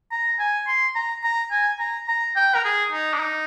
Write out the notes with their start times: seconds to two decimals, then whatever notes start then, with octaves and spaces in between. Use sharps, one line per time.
0.12 A#5
0.39 G#5
0.68 C6
0.95 A#5
1.24 A#5
1.52 G#5
1.80 A#5
2.08 A#5
2.36 G5
2.55 A#4
2.65 G#4
2.92 D#4
3.14 D4
3.20 D#4